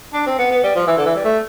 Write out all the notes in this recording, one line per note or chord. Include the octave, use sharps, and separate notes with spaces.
D4
C4
B3
B3
G3
F3
E3
D3
E3
G3
A3